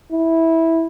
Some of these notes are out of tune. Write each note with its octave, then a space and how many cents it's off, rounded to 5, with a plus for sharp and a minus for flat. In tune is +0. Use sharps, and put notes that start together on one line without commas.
E4 -10